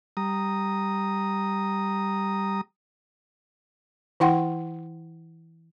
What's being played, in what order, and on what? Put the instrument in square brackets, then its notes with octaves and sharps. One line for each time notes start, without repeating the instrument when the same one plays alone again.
[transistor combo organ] G3 A#5 D#6
[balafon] E3 E4 F#5 G5 C6